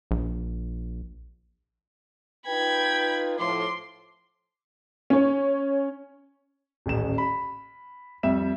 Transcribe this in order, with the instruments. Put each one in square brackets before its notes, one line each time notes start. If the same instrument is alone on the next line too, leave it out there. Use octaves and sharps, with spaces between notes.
[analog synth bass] A#1
[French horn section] D#4 F4 B4 [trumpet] G5 [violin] B5 G#6
[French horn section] A2 F3 [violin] C6 [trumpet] D6
[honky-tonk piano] C#4 C#5
[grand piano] D#1 A1 E7
B5
F2 G3 E5 E7